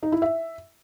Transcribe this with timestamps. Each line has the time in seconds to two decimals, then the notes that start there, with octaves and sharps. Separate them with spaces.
0.03 D#4
0.12 E4
0.22 E5